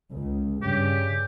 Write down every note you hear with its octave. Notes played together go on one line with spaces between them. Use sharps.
C#2
G2 C#3 G4